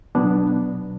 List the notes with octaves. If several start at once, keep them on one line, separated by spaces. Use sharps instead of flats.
B2 F#3 B3 D4